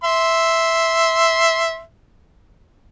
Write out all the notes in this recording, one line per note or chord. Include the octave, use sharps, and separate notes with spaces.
E5 C6